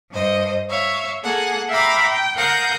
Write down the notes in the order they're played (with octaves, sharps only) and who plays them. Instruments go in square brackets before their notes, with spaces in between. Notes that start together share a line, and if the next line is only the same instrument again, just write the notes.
[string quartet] G2 C5 D#5
C#5 E5 F5 C#6
A#3 G#4 A4 F#5
E5 F5 G5 A#5 B5 D6
G5
A#4 F5 F#5 D#6 G6 A#6